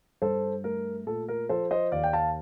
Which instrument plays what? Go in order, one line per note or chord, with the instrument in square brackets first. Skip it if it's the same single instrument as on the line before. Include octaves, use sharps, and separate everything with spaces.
[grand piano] G2 A4 C5
A3 A#4
A#2 A4
A#4
F3 A4 C5
C5 D#5
D#2 D5 F5
G5
F5 A5